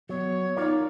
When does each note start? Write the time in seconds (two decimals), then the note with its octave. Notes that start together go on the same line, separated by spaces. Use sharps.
0.09 F#3 B3 C#5
0.57 D#4 F4 A#4 D5